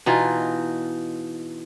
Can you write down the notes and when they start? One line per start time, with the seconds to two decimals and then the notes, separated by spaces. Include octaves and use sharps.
0.06 B2 E3 D#4 F4